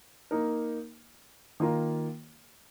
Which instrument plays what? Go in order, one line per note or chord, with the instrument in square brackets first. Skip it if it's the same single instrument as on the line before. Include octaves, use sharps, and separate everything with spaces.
[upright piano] A#3 D#4 A#4
D#3 A#3 F4 A#4